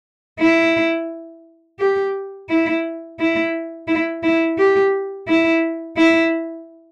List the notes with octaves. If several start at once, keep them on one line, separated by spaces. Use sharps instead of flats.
E4
G4
E4
E4
E4
E4
G4
E4
E4